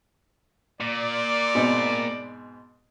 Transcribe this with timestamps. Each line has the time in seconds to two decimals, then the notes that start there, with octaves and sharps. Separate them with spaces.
0.81 A#2 D5
1.55 G#2 B2 C4